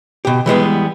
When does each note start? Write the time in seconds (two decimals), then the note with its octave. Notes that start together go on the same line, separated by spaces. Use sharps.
0.25 B2 G4
0.46 E3 G3 G#3 B3